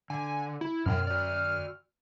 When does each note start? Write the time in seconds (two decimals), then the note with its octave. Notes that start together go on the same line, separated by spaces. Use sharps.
0.10 D3 G#5
0.61 E4
0.86 F#2 B2 A#4 G5 F6
1.07 F#4 D5